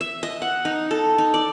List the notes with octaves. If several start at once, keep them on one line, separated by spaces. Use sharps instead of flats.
E5
D#5
F#5
D#4
A4
D#4
D5